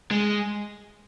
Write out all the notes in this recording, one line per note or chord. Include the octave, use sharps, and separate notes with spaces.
G#3